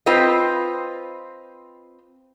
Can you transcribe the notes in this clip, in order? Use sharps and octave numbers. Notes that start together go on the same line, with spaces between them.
C4 F4 B4 C5 D#5